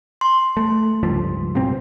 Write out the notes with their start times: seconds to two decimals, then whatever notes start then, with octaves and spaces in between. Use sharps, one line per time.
0.21 C6
0.57 A3
1.03 C#2 G2 F3
1.55 G2 B2 C4